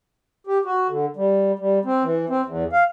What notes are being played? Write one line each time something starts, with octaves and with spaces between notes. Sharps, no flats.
G4
F#4
D3
G3
G3
C4
E3
C4
E2
F5